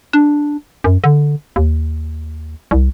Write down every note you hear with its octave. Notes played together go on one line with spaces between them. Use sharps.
D4
F#2
D3
D#2
C2